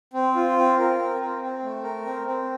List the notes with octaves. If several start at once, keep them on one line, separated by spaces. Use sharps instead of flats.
C4
F4
C4
A#4
C4
C4
C4
A3
A#4
C4
C4